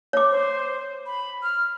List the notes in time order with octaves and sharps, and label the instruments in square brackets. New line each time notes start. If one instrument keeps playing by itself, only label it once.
[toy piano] C#5 D6
[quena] C5
B5
F6